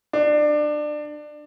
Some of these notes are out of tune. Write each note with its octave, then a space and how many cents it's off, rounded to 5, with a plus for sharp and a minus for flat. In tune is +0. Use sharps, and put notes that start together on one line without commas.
D4 +25